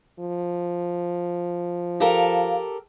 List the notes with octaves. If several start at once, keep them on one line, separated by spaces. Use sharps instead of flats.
F3
G4 A4 A#4 F5